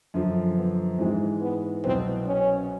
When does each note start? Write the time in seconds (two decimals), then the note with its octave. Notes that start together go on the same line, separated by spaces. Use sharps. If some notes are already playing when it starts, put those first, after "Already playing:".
0.14 F#2 D3 F3
0.56 B3
0.99 G#2 E3 G#3 C4
1.41 B3
1.84 C2 B2 F#3 B3 C4
2.26 C#4